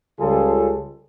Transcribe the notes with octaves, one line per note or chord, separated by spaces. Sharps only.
C#2 C#3 G3 F4 G#4 A4